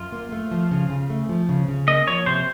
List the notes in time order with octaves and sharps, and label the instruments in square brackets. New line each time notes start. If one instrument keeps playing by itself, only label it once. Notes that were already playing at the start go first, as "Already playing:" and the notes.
Already playing: [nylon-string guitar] F#2 [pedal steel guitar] F4
[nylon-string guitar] A#3
A3
F3
C#3
C#3
A3
F3
C#3
C#3
[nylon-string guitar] A#3 [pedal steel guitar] D#5
[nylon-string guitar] F3 [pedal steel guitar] C#5
[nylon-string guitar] C3 [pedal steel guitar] C5